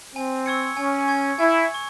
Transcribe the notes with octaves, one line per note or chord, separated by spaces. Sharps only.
C4 G#5
C#6 E6 G#6 C#7
C#4 G#5
C#6 G#6 C#7
E4 G#5
C#6 G#6 C#7